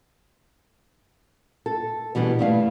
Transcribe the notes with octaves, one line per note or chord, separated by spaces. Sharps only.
A4
B2 E3 G3 C#4 D4
G2 G3 A3 E4 F5